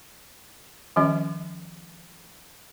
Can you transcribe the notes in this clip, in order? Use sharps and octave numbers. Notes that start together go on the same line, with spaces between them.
D#3 F3 G3 C#4 D#5